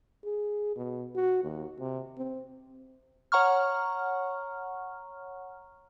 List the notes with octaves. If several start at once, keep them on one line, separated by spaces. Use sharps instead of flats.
G#4
B2
F#4
D#2
C3
C4
C#5 F#5 A#5 C#6 F6